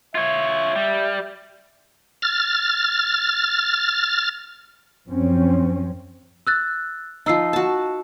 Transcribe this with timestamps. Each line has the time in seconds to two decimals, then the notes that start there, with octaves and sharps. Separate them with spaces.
0.15 F4 C#5 E5
0.76 G3
2.22 F6 A6
5.08 F#2 F3 C4 C#4
6.47 E6 F#6 A6
7.26 F3 D#4 D#5 E6 C7
7.53 F#4 A5